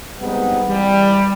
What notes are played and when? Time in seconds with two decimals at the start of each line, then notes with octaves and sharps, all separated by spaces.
0.20 G3 G#3 B3 C4 D#4
0.67 E3 G3